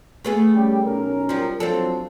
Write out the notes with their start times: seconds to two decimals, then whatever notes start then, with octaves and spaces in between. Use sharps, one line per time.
0.24 A3 B3 G#4
0.55 G3 C#4 G4
0.86 B1 C#4 A#4
1.29 F3 G3
1.60 F3 F#3 C4 D4 A4